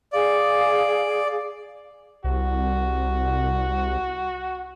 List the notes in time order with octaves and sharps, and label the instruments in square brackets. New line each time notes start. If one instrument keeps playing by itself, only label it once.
[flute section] G#4 F5 [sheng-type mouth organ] D5
[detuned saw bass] C2 [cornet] F#4